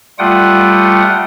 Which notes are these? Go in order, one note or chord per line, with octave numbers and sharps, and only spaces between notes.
G3 A3 F4 F#5 G5 D#6